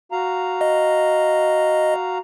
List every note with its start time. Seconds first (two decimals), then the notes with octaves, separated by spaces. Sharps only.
0.12 F#4 F5 A#5
0.61 D#5